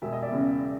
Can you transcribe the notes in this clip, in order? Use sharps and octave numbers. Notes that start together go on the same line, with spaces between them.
E1 E5
D#5
D5 E5
E2 C#3